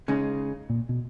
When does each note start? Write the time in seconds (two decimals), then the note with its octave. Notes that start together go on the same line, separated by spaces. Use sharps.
0.08 C#3 G#3 D#4
0.69 A#2
0.89 B2